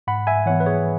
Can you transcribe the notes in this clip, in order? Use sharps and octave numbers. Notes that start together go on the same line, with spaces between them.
G#2 F#5 B5
E5 G#5
E3 B3 C#5 F#5
B4
G#4 C#5